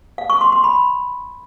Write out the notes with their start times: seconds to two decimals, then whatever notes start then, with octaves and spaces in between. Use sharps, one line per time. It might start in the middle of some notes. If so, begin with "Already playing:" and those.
0.18 F5
0.30 C#6
0.41 C6
0.52 C6
0.64 B5